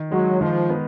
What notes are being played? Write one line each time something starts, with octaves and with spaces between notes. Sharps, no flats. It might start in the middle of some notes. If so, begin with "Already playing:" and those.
Already playing: D#3
F#3 G#3
D#3 F3
B3